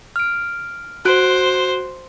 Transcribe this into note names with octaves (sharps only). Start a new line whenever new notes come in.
F6 D7
F#4 C5 F#6 D7